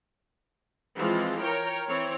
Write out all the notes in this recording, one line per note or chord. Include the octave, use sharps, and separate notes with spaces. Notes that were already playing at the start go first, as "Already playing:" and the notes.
E3 F3 G#3 C4 F4
A#4 C#5 G5
E3 C4 C#5